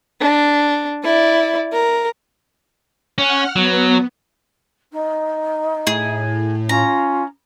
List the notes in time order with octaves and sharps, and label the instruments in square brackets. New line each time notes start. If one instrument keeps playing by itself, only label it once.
[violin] D4
E4 D5
A#4
[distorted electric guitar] C#4 [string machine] F#5 F6
[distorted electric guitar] F#3 [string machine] B3
[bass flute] D#4
[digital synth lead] A2 [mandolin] G#4
[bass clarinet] C#4 [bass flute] F4 [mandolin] A#5